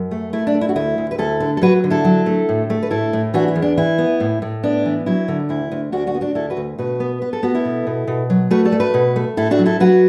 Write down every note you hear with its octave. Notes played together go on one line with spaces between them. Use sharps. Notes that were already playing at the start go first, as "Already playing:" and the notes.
Already playing: F#2
A3
A3 E4
D4
A3
E4
F#4
D2 E4
D2
B4
D2 E4 A4
D3
A4
F#3 F#4 B4
D3
E4 A4
F#3
A3
A2
A3
B4
A2 E4 A4
A2
E3 D4 F#4
E4
E2
D4
E3 E4
B3
A2
A2
B3 D4
E3
F#3 E4
D3
D2 E4
D2
D2 D4 F#4
D4 F#4
B3
D4 F#4
D2 E4 A4
F#4 B4
D2
B2 F#4 B4
B3
B3 B4
A4
B3 F#4
E4 A4
B2
B2
B2
F#3
A3 F#4 B4
A4 D5
A3
F#4 B4
B2
A3
A2 E4 A4
D4 F#4
F#3
E4 A4
F#3 F#4 B4